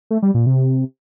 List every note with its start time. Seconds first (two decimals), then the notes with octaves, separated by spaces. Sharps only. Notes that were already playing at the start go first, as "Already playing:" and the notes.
0.11 A3
0.22 G3
0.34 A#2
0.46 C3